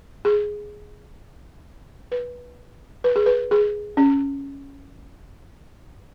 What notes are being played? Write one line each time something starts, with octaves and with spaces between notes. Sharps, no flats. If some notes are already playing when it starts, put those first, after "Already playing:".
G#4
B4
B4
G#4
B4
G#4
C#4